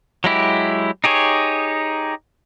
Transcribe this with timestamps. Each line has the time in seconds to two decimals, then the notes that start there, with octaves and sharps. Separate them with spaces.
0.24 F#3 G#3 E4 G4
1.04 D#4 G4 G#4 C#5